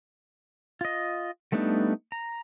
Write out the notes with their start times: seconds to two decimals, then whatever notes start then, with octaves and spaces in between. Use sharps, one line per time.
0.81 F4 D#5
1.52 G3 A3 B3 D4 D#4
2.12 A#5